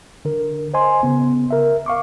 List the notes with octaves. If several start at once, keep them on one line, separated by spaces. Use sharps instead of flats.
D3 A#4
C5 D#5 G#5 C6
C#3 B3
A#4 E5
F5 C#6 D6